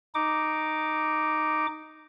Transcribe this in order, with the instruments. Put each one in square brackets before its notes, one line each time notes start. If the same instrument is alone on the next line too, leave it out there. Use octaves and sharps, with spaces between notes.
[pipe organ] D#4 D6